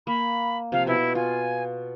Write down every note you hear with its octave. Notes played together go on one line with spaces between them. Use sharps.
A#3 B5
C3 F3 F5
B2 E4
F4 G#5